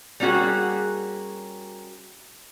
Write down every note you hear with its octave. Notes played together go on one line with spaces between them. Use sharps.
G3 A#3 C#4 F#4 G#4